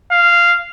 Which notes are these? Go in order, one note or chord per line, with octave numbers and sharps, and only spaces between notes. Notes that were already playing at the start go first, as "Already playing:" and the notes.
F5